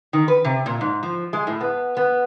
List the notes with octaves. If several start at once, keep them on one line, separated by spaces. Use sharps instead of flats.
D#3
B4
C3
A#2
G#2
F3
G#3
A2
B3
B3